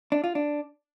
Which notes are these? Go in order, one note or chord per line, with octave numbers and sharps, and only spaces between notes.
D4
F4
D4